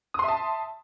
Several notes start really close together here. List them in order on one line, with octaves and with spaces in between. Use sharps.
D#6 C6 E5 A5